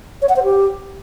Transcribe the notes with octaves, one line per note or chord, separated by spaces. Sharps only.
C#5
F#5
C5
G4